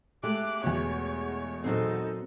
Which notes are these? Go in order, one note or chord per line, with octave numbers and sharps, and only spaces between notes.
G#3 A3 G4 D6 F#6
E2 B2 C#5
A#2 F#3 C4 D#4 A4